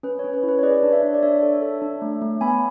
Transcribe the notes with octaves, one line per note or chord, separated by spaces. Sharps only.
C#4 B4
C#5
C#4
B4
E4
B4
C#5
G#4 B4 D5
D4
C#5 E5
D4
D5
D4 C#5 E5
A4
A4
D4
A3
A3
B3 G#5 B5